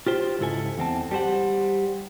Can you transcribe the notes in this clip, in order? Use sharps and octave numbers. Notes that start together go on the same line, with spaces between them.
F4 G4 C5
C#2 G#2 E4 A4 G#5
E2 C4 A5
G3 G4 C5 F#5